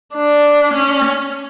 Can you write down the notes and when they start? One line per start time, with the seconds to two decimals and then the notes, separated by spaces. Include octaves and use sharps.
0.15 D4
0.74 C#4